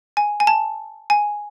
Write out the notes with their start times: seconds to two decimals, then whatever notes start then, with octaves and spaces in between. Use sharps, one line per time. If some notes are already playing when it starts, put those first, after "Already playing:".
0.17 G#5
0.40 G#5
0.47 A5
1.10 G#5